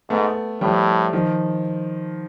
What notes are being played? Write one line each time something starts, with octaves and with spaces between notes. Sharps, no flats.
G#2 A3 B3
A2 F3 G3
D#3 F3